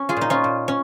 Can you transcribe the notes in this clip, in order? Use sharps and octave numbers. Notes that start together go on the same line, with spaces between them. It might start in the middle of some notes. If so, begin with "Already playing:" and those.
Already playing: C#4
F4 G#4
A#2 D#4
C#4 F4
A#2
C#4